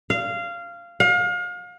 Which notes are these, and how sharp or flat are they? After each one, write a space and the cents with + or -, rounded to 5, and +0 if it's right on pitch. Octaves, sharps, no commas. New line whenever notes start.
F5 -15
F5 +35